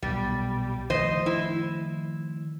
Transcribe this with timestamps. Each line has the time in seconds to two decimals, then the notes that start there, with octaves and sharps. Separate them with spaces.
0.02 B1 A#2 G3 B3
0.90 D#3 F3 A3 C5 D#5
1.26 E4